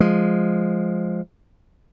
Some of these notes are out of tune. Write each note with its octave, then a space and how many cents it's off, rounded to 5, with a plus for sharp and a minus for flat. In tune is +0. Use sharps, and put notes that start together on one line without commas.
F3 +0 G#3 +0